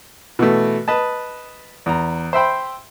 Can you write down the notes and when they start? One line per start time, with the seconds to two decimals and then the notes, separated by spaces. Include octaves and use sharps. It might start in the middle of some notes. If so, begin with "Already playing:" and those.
0.39 B2 E3 A3
0.88 B4 D#5 A5
1.86 E2 A#5
2.33 C5 E5 G5 B5